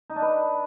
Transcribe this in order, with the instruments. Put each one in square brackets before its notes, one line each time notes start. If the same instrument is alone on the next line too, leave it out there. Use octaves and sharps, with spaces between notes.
[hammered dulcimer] D#4
D4
B4